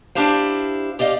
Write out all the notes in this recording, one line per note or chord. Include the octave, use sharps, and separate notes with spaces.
D4 E4 G4 C5 F5
G4 D5 D#5 F5